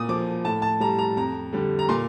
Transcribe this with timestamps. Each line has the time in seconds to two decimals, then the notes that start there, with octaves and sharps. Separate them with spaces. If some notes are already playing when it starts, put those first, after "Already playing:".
Already playing: A#2 D#6
0.09 F3 D6
0.44 A2 A5
0.62 A5
0.80 G3 A#5
0.99 A#5
1.17 F2 A#5
1.53 D3 G3
1.79 A#5
1.89 A#2 C6